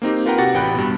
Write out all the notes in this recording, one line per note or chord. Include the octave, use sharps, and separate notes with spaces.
A#3 C4 D#4 G4
F4 A#4 B4 F#5 G5 A#5
C3 F#4 G4 F#5 A6 A#6
A1 G5 B5 F#6
G2 B2